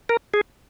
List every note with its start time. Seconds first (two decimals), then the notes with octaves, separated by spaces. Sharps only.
0.09 A#4
0.34 G#4